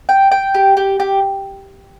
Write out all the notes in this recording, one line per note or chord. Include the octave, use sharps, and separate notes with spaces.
G5
G5
G4
G4
G4